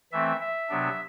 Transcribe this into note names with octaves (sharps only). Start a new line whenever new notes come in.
E3 A3 C4 E5
E5
C3 F#3 B3 D4